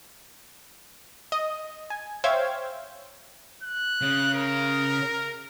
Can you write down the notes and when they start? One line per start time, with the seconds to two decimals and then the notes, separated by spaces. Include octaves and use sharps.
1.32 D#5
1.90 G#5
2.24 C5 C#5 E5 F5 G5 G#6
3.63 F#6
4.01 C#3
4.34 A#4